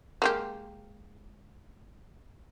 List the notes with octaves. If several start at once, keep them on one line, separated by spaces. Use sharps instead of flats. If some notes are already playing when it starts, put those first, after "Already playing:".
G#3 A#3 G4